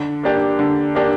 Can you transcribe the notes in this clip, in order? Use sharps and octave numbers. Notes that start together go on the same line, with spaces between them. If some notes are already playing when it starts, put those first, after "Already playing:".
Already playing: D3
A#3 D4 G4
D3
A#3 D4 G4